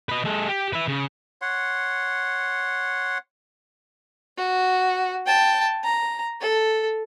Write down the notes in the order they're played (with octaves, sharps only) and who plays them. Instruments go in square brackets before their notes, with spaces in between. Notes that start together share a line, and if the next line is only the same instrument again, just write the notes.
[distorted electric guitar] B4 D#5
G#3 A4
G4
B4 E5
C#3
[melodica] C#5 F#5 C6
[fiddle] F#4
G5 A5
A#5
A4